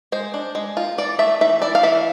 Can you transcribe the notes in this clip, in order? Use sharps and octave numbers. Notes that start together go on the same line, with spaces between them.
G#3 C5
D4
G#3
F4
E3 D5
A3 E5
E3 E5
E4 D5
F5
E3 E5